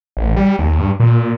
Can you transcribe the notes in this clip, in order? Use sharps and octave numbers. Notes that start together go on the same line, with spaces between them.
A1
G3
D#2
G2
A#2